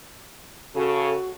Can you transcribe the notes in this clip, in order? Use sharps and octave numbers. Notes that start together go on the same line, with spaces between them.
C#3 F#4 A4